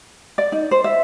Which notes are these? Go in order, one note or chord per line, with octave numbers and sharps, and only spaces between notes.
D5
D#4
C5
E5